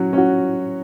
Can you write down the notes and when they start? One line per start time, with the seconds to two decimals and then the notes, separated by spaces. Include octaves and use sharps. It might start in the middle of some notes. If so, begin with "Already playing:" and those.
Already playing: F#3 C#4 F#4
0.13 C#4 F#4